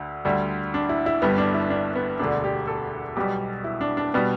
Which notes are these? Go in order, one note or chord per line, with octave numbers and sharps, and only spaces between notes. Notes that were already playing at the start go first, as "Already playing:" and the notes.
Already playing: D2 D3
D2 D3 G3
D4
E4
E4
G1 G2 G3 B3
D4
E4
D4
B3
E1 D2 D3 D4
G4
A4
B1 B2 G3 G4
E4
D4
D4
B2 G3 B3